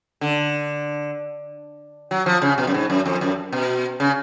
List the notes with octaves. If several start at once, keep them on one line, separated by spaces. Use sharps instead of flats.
D3
F#3
F3
C#3
B2
F#2
G#2
F#2
F2
F#2
B2
C#3